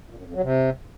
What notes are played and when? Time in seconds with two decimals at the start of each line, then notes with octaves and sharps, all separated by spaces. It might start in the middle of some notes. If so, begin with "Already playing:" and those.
0.10 A#2
0.18 F#2
0.26 F2
0.34 F#3
0.43 C3